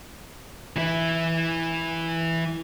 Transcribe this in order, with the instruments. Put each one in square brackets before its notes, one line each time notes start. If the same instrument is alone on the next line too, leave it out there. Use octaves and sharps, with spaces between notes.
[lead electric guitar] E3 E4